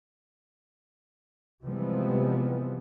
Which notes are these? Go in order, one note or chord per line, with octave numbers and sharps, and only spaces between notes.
C3 E3 F3 G3 G#3 B3